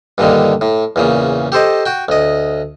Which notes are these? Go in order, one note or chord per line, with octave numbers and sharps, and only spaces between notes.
G2 A#2 D3 D#3
A2
E2 A#2 C#3
G4 A4 C5 D#5
F#4 G5
D2 D#5